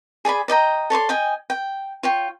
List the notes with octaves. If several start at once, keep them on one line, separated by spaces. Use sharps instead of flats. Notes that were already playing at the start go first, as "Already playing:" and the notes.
G#4 D5 G#5 B5
D5 D#5 G5 A#5
A4 C#5 D5 C6
D#5 G5 G#5
G5
F4 C#5 G5